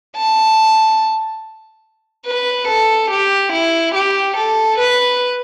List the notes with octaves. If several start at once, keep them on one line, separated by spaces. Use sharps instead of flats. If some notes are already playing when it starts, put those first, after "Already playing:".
A5
B4
A4
G4
E4
G4
A4
B4